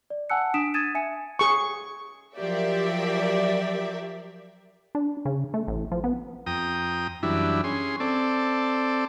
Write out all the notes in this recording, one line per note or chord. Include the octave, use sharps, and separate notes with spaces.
D5
F#5 G#5 A5 E6 F#6 C#7
D4 D#6 B6 D7 E7
D#6 G#6 A6 D#7 E7
E5 G#5 C#7
G#4 C#6
F3 F#3 G4 A#4 D5 E5
D4
C#3
A3
A1
F3
B3
F2 G5 A#5 D#6
F#2 E3 G3 D4 E4
C#4 G#4 C6
C4 A4 D5